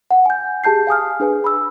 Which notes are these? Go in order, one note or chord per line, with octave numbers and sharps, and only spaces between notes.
F#5
G#5 G6
G4 G#4 A5 G6 C7
F5 G#5 D#6 F6
D4 G#4 B4 G#5
B5 E6